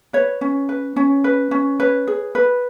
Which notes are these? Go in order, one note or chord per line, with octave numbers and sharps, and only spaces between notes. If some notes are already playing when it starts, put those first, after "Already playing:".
B4 C#5
C#4
B4
C#4
B4
C#4
B4 C#5
G#4
B4